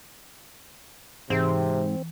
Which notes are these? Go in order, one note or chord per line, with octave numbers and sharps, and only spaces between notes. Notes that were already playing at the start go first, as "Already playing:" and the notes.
G#2 C3 E3 C4